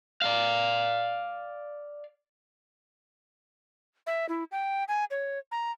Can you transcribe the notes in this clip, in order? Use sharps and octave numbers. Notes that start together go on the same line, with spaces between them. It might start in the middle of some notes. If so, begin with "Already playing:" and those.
D5 F5
E5
E4
G5
G#5
C#5
A#5